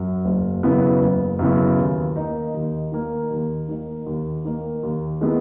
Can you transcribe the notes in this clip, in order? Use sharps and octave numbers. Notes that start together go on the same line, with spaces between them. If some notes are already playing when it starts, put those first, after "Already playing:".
Already playing: F#2
F#1
F#2 C#3 E3 B3
F#1
F#2 C#3 E3 B3
D#2
D#3 A#3 D#4
D#2
D#3 A#3 D#4
D#2
D#3 A#3 D#4
D#2
D#3 A#3 D#4
D#2
D#3 G#3 B3 E4